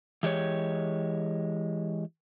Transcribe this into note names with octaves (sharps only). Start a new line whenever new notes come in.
E3 G#3 G4 C#5